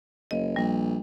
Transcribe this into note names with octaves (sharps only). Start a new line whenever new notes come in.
F#1 D#5
A#1 G3